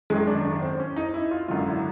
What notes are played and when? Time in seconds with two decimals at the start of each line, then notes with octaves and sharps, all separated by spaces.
0.10 G#1 F#2 D#3 G#3
0.27 D4
0.45 D4
0.62 C4
0.79 C#4
0.96 D#4
1.14 E4
1.31 F4
1.48 G#1 F#2 D3 F#3 F4
1.66 E4